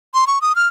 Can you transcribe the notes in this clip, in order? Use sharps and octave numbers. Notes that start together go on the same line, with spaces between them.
C6
C#6
D#6
F6